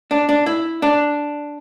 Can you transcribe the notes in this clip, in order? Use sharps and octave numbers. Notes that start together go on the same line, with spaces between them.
D4
D4
E4
D4